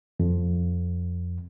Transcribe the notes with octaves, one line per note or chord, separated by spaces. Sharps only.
F2